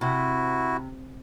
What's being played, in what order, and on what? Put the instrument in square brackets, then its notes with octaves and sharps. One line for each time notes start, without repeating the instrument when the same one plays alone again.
[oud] C3 [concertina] E4 F#4